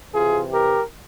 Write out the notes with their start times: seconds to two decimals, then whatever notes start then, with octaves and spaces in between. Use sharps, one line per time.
0.13 C3 E3 F4 G#4
0.53 G4 A#4